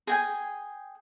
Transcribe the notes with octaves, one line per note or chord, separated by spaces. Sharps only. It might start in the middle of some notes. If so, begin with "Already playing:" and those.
G#4 G5 G#5